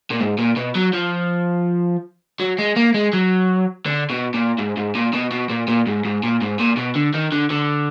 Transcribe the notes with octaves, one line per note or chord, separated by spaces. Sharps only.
A#2
G#2
A#2
B2
F#3
F3
F#3
G#3
A#3
G#3
F#3
D3
B2
A#2
G#2
G#2
A#2
B2
B2
A#2
A#2
G#2
G#2
A#2
G#2
A#2
B2
D3
D#3
D3
D3